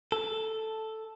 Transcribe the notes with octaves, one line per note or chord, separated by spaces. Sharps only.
A4